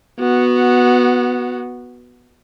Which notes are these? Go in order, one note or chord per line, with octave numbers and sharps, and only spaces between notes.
B3 F#4